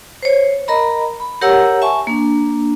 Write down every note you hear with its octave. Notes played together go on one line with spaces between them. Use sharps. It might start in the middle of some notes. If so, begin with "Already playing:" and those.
C5 C#5
A#4 D#5 A#5 B5
B5
G4 A#4 C#5 F#5 A#5 E6
E5 G#5 A5 C#6
A#3 D4